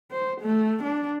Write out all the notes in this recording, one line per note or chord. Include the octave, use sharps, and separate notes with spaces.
C5
A3
D4